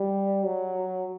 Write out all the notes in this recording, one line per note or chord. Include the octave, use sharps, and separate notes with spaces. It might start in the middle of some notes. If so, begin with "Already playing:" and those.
Already playing: G3
F#3